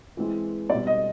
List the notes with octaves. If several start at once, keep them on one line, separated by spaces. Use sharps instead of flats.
E3 G#3 C4
B2 G3 C4 D5
D#5